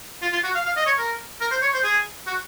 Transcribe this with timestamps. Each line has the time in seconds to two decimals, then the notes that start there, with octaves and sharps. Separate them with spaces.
0.22 F4
0.32 F4
0.44 F#4
0.55 F5
0.66 F5
0.76 D#5
0.86 C#5
0.98 A#4
1.41 A#4
1.51 C5
1.62 C#5
1.74 C5
1.84 G#4
2.27 F#4